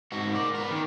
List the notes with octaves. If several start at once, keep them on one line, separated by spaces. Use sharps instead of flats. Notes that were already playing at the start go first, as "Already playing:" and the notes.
G#2 F#4
A#4 D5
B3 A#4
D#3